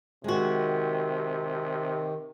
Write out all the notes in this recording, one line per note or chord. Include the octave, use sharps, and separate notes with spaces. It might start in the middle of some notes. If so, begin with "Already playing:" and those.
C3 D#3 G#3 F#4